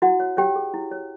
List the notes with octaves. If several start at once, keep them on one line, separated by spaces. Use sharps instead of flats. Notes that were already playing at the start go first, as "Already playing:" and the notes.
E4 F#4 F#5
C#5
G4 C#5 G5
G#4
E4
C#5